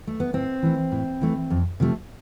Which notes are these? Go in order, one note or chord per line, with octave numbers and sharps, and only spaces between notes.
A3
B3
A2 C4
E3 A3
A2
E3 A3
F2
C3 F3 A3